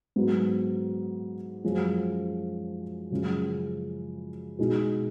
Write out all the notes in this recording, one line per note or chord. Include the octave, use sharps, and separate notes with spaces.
G#2 F#3 B3
F#2 F3 G#3 C#4
F#2 C#3 F3 G#3
B2 G#3 D#4